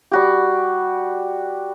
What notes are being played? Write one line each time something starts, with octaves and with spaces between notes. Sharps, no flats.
G3 F#4 G4